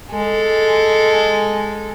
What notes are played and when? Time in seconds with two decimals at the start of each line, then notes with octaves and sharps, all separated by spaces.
0.11 G#3 A4